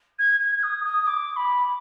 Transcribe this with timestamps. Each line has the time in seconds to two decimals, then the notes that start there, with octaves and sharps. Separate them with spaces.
0.18 G#6
0.40 G#6
0.63 D#6
0.84 D#6
1.07 D6
1.36 B5